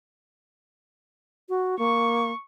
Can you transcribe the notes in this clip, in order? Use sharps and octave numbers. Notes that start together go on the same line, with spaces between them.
F#4
A#3 C#6